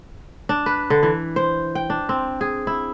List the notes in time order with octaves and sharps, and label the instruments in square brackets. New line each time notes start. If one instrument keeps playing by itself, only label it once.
[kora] D4
B4
D3
E3
C5
G5
D4
C4
G#4
E4